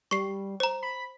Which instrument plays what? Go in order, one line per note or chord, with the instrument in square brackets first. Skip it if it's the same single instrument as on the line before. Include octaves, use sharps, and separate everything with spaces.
[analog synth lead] G3 [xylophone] C#6 C7
[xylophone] C5 A#5
[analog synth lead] B5